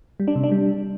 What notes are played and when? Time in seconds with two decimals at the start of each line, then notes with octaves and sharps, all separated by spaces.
0.20 G3
0.28 D4
0.36 C3
0.43 D4
0.51 G3